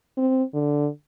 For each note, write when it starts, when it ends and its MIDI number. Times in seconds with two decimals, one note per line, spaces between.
0.17 0.43 60
0.54 0.88 50